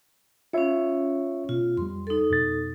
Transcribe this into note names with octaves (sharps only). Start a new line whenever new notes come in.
C#4 F4 C#5 E5
B2 F4
F2 G3 C6
D#4 A4
F2 B2 A6